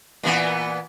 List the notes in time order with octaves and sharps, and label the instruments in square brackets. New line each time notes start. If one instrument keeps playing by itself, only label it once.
[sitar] A#2 E3 B3